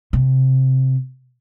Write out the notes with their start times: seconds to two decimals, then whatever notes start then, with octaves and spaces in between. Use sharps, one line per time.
0.13 C3